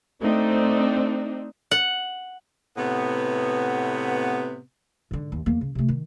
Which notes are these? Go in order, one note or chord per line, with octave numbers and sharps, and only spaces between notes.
A3 C4 D4 D#4
F#5
A2 C3 B3
G#2 D3
D#2
E2 A#3
C#3
C3 A3
D#3